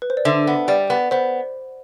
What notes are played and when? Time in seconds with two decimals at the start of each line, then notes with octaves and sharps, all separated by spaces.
0.02 B4
0.10 C5
0.17 D5
0.25 D3 E5
0.47 B3
0.68 G3 D5
0.90 B3
1.11 B3 C5